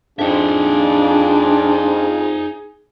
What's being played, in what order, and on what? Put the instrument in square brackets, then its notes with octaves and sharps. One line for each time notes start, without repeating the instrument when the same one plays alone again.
[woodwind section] F2 [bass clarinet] D4 [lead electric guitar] D#4 E5 [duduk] G#4